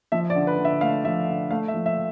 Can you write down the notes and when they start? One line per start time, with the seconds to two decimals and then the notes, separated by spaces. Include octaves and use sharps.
0.12 F3 E5
0.30 D5
0.35 D3
0.47 B4
0.58 D3
0.65 E5
0.81 A3 F5
1.04 F3 E5
1.28 D3
1.51 A3 F5
1.68 E5
1.74 F3
1.86 E5